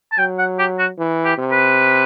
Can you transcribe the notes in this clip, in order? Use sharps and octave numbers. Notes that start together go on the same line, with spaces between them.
A5
F#3 G5
F#5
G4
F#4
E3
G4
C3
B4